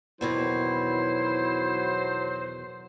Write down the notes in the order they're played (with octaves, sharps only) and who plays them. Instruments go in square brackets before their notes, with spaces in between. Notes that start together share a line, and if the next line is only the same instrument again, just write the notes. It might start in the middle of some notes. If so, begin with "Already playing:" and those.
[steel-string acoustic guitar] E2 B2 D#3 [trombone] F#3 [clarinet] E4 [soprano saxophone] C5